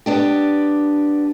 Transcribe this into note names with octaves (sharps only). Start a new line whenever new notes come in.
B3 D4 G4